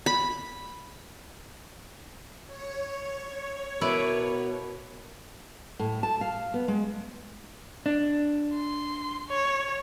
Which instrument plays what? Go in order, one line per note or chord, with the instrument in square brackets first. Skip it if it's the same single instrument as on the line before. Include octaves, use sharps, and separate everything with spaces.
[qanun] B5
[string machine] C#5
[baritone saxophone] B2 [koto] E4 B4 D5 [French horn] A#4
[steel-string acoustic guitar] A2
A5
F5
B3
G#3
[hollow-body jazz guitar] D4
[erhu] C6
C#5